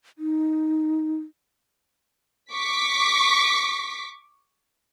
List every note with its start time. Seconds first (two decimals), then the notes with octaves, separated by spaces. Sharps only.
0.18 D#4
2.53 C#6 D6 B6